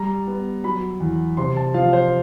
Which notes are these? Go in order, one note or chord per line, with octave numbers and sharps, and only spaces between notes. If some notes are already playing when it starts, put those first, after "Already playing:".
Already playing: G3 A#5
B3
F#3 B5
E2
C3 C6
A5
F3 F5
C5